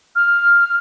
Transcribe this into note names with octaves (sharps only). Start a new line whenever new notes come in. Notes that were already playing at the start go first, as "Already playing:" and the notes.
F6